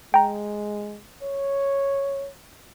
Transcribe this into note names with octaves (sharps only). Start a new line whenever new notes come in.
G#3 G5 A#5
C#5